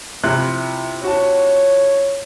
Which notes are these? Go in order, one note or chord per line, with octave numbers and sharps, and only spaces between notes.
C3 E4 F4 F#6
F#4 C#5 A5